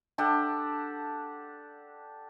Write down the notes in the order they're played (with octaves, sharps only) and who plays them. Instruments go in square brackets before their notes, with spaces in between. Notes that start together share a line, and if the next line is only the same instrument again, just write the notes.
[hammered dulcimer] D4 G4 A4 F#5